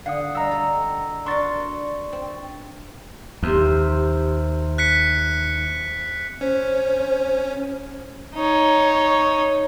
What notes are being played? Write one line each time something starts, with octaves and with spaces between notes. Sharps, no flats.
D3 F5 F#5 D#6
G3 D#5 A#5 E6
A4
D4 F#4 A#4 C6 C#6 A6
C4
D#2 C3 C4
F#6 B6 C#7
C#4 C5
D#4 C#5